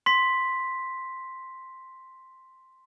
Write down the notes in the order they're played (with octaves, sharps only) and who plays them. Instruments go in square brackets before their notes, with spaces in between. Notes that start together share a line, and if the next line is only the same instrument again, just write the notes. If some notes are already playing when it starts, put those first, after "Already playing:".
[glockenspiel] C6 B6